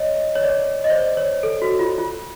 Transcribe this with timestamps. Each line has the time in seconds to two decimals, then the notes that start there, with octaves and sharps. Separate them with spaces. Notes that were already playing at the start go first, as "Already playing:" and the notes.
Already playing: C#5 D#5
0.35 C#5
0.43 D5
0.49 C#5
0.84 D#5
0.90 C5 D5
1.17 C#5
1.43 A4
1.62 F#4
1.79 F4
1.98 F4